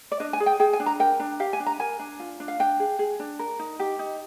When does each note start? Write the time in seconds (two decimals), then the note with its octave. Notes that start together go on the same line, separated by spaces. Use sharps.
0.11 D5
0.20 D4 D#5
0.33 G#5
0.40 G#4
0.46 G5
0.60 G#4 G5
0.73 G#5
0.80 D4
0.86 A#5
0.99 A#4 G5
1.20 D4
1.40 G4 F5
1.53 G#5
1.60 D4
1.66 A#5
1.80 A#4 G#5
1.99 D4
2.20 F4
2.40 D4
2.48 F5
2.60 D4 G5
2.80 G#4
2.99 G#4
3.20 D4
3.39 A#4
3.59 D#4
3.80 G4
3.99 D#4